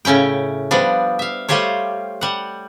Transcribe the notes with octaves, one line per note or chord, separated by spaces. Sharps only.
A2 C#3 C#4 E4 G5
F3 G3 B3 D4
E5 F5
G3 A3 F4 G4 C5 C#5
G3 F#5